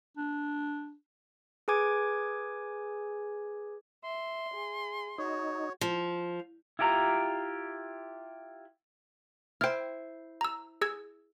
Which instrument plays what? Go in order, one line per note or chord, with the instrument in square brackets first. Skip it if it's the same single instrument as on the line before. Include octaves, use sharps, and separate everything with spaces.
[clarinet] D4
[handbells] G#4 B4 G#5 D6 G#6
[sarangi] E5 [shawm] C6
[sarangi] G#4
[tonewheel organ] D#4 [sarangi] F#4 [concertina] C#5
[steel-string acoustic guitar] F3
[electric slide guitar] E4 F4 G4 C5 A#5
[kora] E4 C5 [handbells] G5 F6
[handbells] A#5 E6
G#4 E6 G#6